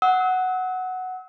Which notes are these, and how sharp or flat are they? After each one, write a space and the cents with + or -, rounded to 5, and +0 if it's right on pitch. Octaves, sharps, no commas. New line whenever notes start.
F#5 +0 E6 -40